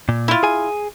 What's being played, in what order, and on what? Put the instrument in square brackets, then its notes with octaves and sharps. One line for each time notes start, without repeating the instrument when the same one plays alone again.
[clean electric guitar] A#2
[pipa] E4 F4
[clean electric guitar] G#4 G#5